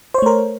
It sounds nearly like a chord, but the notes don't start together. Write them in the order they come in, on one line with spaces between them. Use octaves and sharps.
C5 C#5 A3 A#4